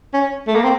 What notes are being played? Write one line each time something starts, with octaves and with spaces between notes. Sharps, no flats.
C#4
A3
A#3
C4